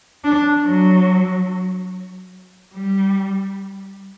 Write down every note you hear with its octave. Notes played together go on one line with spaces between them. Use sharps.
D4
F#3
G3